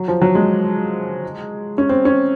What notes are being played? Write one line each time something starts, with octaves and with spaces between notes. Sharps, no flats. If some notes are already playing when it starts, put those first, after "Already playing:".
Already playing: F#3
F3
F#3
G#3
C#4
C4
C#4